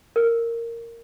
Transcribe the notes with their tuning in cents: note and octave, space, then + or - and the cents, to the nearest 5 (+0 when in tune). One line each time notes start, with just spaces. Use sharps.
A#4 -10